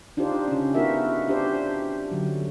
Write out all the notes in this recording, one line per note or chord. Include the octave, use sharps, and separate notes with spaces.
D4 D#4 F4 G4 C5
C#3 C#4
B3 D#4 F4 F#4 A#4 E5
D4 G4 C5
D3 F#3